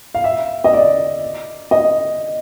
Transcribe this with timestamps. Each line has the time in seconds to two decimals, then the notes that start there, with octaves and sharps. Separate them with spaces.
0.15 F5
0.24 E5
0.64 D#5
0.73 D5
1.71 D#5